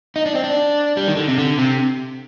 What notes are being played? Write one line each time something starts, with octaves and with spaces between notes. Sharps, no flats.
D#4
D4
C4
D4
G3
D#3
D3
C3
D3
C3